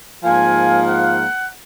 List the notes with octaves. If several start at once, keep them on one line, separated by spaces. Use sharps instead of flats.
G#2 F3 A#3 G#5
F#5